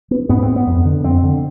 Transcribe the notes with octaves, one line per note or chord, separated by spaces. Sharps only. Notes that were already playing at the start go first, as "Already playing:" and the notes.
B3
G#2 B3
C4
B3
F2
D3
F2 C4
D3